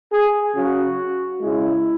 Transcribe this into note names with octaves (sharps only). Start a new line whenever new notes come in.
G#4
C#3 F#3 F#4
C#3 G#3 E4